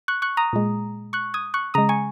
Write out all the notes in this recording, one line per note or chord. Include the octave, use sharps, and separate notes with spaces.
C#6 F#6
C#6 F#6
A#5 D#6
A#2 G#3
C#6 F#6
D#6 G#6
C#6 F#6
C#3 G#3 A#5 D#6
G#5 C#6